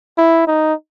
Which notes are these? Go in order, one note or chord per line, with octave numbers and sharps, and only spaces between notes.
E4
D#4